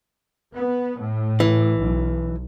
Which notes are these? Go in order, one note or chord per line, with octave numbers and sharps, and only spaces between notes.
B3
A2
E3
B1